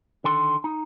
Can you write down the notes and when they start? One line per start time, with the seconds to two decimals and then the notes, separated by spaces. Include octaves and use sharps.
0.24 D3 D#3 A4 C6
0.64 D#4